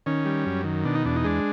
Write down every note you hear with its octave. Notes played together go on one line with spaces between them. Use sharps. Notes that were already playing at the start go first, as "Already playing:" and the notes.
D#3 C#4
G3
F#2
D#3
B2 D4
D#4
E2 D4
D#4
G#3 D4